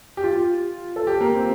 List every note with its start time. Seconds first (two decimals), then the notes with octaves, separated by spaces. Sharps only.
0.17 G4
0.24 F4
0.96 A4
1.07 G4
1.21 A#3
1.35 C4